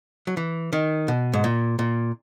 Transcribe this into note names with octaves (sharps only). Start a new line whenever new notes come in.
F#3
E3
D#3
B2
G#2
A#2
A#2